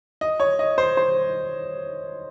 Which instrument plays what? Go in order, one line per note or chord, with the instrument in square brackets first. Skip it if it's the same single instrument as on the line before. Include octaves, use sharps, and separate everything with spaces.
[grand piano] D#5
C#5
D#5
C5
C5